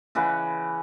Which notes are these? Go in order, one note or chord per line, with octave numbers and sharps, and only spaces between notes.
C#3 E3 B4 F#5